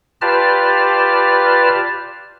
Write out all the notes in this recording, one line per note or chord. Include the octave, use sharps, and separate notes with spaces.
F4 G4 B4 D5 A5 F6